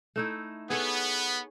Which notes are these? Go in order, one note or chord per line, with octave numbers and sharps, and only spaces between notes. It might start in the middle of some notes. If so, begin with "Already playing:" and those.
A3 D#4 E4
B3 G#4 A4 C#5